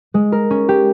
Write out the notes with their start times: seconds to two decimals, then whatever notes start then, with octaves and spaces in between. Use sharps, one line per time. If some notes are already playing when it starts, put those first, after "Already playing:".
0.14 G#3
0.32 A#4
0.50 C#4
0.69 G4